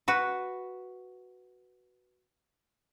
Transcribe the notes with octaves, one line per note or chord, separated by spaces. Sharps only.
F#4 B4